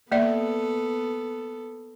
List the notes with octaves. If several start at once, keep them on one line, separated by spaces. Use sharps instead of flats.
A#3 B3 A4 D5 E5